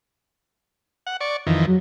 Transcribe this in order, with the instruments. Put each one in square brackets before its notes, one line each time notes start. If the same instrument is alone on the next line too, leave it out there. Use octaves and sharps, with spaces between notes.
[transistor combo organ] F#5
D5 C#6
F2 D#3 E3
[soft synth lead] F#3